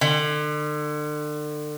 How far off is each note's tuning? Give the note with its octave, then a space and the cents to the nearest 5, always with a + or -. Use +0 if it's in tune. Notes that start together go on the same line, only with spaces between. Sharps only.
D3 +35